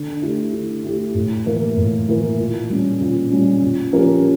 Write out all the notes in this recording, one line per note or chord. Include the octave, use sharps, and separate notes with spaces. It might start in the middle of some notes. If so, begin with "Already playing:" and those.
Already playing: D3
A3 E4 G4
D3
A3 E4 G4
A2
E3 A#3 E4 A#4
A2
E3 A#3 E4 A#4
A#2
G3 C#4
A#2
G3 C#4
A#2
F3 C#4 G4 A#4